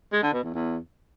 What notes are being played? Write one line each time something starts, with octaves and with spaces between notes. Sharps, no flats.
G#3
D3
B2
E2
E2